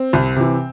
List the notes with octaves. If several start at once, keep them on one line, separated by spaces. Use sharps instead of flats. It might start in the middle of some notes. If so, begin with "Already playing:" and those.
Already playing: C4
C2
C3 E3